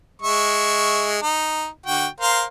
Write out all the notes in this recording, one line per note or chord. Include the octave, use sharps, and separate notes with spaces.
G#3 E5 C#6
D#4
D3 F#4 G5
A#4 C5 F5